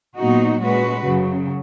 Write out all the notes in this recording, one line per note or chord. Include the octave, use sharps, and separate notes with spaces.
A#2 F#3 B3 D#4 F#4
A#2 G#3 C#4 F#4 B4
F#2 C#3 F#3